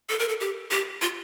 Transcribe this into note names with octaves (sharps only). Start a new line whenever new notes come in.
A4
A#4
A4
G4
G4
F4